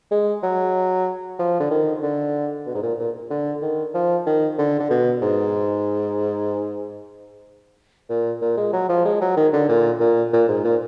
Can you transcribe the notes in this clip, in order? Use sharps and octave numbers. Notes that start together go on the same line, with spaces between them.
G#3
F#3
F3
D3
D#3
D3
B2
G#2
A#2
A#2
D3
D#3
F3
D#3
D3
D3
B2
G#2
A#2
A#2
G#3
F#3
F3
G#3
F#3
D#3
D3
A#2
A#2
A#2
G#2
A#2